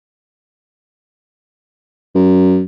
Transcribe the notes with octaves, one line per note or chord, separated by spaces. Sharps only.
F#2